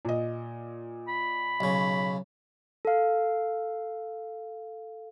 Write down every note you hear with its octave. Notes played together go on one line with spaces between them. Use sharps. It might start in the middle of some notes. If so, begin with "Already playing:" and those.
A#2 D#5
B5
B1 C#3
A4 F5